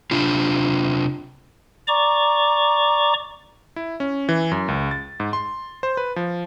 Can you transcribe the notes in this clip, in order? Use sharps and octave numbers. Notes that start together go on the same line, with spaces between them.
C3 D4 F4
D5 A#5 C#6 D6
E4
C#4
E3
F#2
C#2
A6
G#2
C6
C5
B4
F3